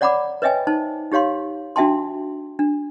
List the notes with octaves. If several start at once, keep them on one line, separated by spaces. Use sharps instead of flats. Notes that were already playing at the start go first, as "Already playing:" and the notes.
C#5 D5 F#5 A#5 B5 D6
B4 C#5 D#5 E5 G5 G#5
D#4 C5 A5
D#4 G4 C#5 F5 C6
D4 F#4 E5 G5 A5 C6
D4